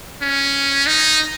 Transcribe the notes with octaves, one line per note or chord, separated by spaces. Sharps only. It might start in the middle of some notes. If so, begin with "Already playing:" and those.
C#4
D#4